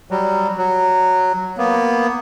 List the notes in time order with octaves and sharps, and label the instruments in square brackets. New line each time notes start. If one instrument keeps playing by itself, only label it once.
[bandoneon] F#3 G3
F#3
A#3 B3